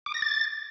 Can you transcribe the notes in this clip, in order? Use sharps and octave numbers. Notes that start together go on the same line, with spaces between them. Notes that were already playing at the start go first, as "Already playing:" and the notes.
D6
A#6
A6